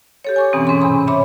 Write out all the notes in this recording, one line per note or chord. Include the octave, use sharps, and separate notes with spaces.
G4 A4 C#5
G#5 C#6 D6
E2 G2 B2 E3 C4 C#4
G#2 C#4 G#4 C6
E2 C3 C#4 B5 C#6
C#5 E5 B5 D6